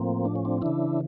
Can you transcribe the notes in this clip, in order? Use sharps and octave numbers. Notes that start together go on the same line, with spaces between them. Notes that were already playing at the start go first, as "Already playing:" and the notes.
Already playing: A2 F3 A#3 C4
D4
C#4
C4 D4
C#3 E3 D4 E4